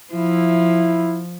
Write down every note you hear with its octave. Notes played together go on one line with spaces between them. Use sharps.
F3 E4